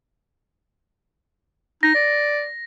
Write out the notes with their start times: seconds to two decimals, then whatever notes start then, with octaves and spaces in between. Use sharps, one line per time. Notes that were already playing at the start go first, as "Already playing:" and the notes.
1.83 D#4 A#6
1.94 D5